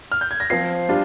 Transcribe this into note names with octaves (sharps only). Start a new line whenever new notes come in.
F6
G6
G#6
A#6
F3 C4 F4 C7
G3 D4 F4